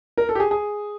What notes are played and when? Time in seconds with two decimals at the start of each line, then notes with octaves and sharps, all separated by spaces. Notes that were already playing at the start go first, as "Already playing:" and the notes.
0.18 A#4
0.29 A4
0.35 G4
0.40 G#4
0.51 G#4